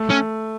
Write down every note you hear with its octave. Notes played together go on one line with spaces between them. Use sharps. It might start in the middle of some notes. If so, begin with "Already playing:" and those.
Already playing: A3
C#4